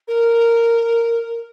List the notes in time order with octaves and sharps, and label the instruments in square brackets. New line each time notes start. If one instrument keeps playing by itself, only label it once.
[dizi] A#4